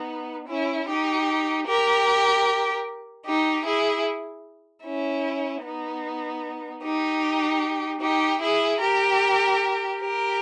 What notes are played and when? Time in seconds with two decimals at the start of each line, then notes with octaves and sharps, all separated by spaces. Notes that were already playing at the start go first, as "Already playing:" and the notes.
Already playing: B3 D#4
0.48 C#4 E4
0.88 D#4 G4
1.67 G4 A#4
3.26 D#4 G4
3.66 E4 G#4
4.84 C#4 E4
5.64 B3 D#4
6.83 D#4 G4
8.02 D#4 G4
8.42 E4 G#4
8.81 G4 A#4
10.00 G4 A#4